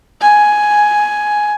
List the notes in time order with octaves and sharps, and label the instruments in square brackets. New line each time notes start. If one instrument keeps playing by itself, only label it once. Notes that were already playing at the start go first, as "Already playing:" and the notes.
[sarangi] G#5